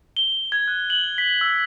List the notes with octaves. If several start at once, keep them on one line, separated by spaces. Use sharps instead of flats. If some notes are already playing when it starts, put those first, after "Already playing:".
G7
G#6
F#6
F#7
B6
E6